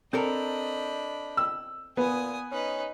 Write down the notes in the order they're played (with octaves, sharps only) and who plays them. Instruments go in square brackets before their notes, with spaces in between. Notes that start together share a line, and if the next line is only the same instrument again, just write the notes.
[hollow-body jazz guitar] C4 A4 A#4 [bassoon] D4 [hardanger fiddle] D#5 B5
[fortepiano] E6
[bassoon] A#2 [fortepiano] B3 [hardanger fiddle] G#5 D#6
[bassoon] C#4 [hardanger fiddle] D#4 B4